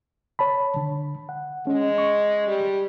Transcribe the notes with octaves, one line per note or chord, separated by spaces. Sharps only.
C#5 A5 B5
D3
F#5
G#3 C#4
C#6
G3